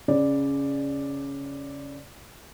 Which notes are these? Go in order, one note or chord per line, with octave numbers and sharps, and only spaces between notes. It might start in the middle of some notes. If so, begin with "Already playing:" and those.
C#3 D5